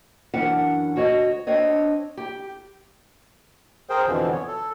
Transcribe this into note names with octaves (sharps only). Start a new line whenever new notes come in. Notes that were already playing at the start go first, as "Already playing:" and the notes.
F#2 E3 C#4 D4 F#5
D2 F#4 C#5 D#5
C4 D4 C#5 D#5
G4
G#4 A#4 C5 G5
F2 B2 D3 E3 F3
B3 C#5
A4